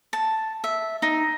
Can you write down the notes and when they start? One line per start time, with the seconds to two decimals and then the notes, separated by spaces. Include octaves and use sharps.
0.13 A5
0.64 E5
1.02 D#4